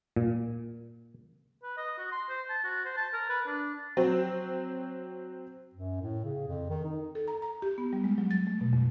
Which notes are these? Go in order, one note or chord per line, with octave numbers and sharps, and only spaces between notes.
A#2
B4
D#5
F#4
C6
C5
A5
F#4
C5
A5
A#4
B4
D4
F#3 C4
F#2
A2
C#3
F2
D#3
D#4
A4
A#5
A#5
G4
B3
G3
G#3
F#3
A6
A3
B2
F2